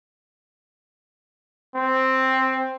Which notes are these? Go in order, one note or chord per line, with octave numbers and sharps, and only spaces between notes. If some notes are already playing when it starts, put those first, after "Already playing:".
C4